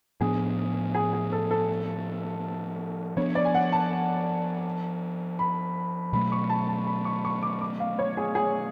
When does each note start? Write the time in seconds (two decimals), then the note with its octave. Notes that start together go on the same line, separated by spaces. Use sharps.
0.21 A2 F3 B3 D4 G#4
0.95 G#4
1.13 G#4
1.32 A4
1.51 A4
3.17 F3 B3 D4 C#5
3.35 D5
3.45 G#5
3.55 F#5
3.72 A5
5.39 B5
6.13 B2 F#3 A3 B5
6.32 C#6
6.49 A5
6.68 A5
6.87 B5
7.05 C#6
7.25 C#6
7.43 D6
7.61 D6
7.80 F5
7.99 C#5
8.17 G#4
8.35 G#4